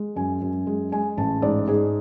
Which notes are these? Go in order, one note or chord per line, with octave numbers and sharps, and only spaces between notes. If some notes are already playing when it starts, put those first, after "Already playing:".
Already playing: G#3
F#2 G#5
F#2
G#3
G#3 G#5
A1 A5
G#2 D5
G#2 G#4